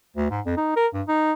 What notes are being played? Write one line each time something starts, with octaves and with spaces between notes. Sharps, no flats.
D2
G#2
F2
D#4
A#4
G2
D#4